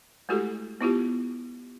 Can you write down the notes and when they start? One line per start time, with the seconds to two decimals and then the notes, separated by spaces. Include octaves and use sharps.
0.29 G#3 A3 E4 F#4 G4 A4
0.81 B3 E4 F4 G4